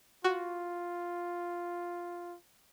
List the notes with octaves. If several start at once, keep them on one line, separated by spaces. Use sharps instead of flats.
F4 F#4